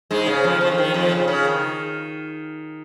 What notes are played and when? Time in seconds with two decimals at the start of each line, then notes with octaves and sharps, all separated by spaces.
0.11 G#2 G#3
0.27 C#3
0.44 F2 F3
0.61 F2 F3
0.72 F3
0.78 D#3
0.94 F2 F3
1.12 C#3
1.28 C#3
1.45 D#3